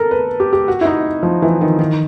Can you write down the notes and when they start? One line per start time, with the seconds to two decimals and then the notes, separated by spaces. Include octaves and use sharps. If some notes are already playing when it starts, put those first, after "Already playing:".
Already playing: A4 A#4
0.11 B4
0.40 G4
0.53 G4
0.68 F#4
0.81 E4
0.85 D#4
1.23 F3
1.42 E3
1.61 D#3
1.79 D#3